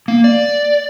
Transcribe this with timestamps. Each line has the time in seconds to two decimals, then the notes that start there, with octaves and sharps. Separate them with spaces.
0.08 A#3
0.24 D5